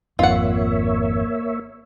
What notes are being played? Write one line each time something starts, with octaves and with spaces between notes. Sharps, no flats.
G#1 F2 A#3 C4 F4 C#5 E5 F#5